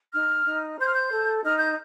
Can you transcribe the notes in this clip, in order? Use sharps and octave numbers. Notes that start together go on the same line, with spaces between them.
D#4 F6
D#4
C5 G6
F6
G6
A4
D#4 F6
G6